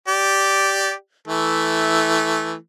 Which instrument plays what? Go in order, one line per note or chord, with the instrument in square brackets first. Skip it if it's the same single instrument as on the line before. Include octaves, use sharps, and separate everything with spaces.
[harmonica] G4 D5
E3 A3